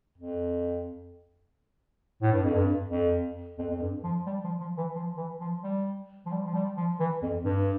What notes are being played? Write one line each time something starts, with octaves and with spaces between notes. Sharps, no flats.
F2
A2
G2
F2
G2
F2
F2
F2
G2
F3
G3
F3
F3
E3
F3
E3
F3
G3
F3
G3
F3
G3
F3
E3
F2
G2